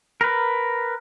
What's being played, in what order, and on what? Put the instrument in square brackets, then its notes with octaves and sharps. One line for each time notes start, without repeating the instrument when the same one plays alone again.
[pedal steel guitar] A#4 B4